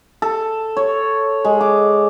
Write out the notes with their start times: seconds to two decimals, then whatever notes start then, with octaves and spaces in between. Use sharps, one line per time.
0.22 A4
0.77 C#5
1.45 G#3
1.61 D6